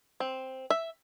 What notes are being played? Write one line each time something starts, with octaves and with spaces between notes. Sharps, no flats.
C4
E5